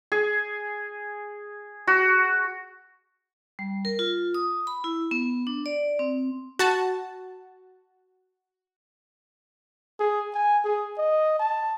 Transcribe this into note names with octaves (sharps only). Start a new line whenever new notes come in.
G#4
F#4
G3
A#4
F4
D#6
B5
E4
B3
D4
D5
C4
F#4 A5
G#4
G#5
G#4
D#5
A5